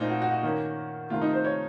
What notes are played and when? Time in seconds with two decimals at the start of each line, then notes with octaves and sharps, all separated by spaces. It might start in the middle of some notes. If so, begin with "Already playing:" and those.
Already playing: A#2 A3 C4 D#4 F4
0.09 F#4
0.22 F#4
0.32 F#4
0.43 D#3 A#3 C#4
1.10 C3 D#3 A3 F4
1.21 D#4
1.34 C5
1.45 C#5